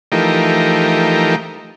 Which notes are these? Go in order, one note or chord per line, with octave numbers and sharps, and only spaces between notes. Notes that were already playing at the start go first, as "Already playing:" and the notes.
E3 F3 A3 D#4 G4 A#4